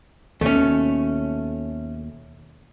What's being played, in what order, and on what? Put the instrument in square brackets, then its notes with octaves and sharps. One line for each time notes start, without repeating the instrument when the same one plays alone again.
[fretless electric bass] D#2 B2 [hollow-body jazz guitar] A3 C#4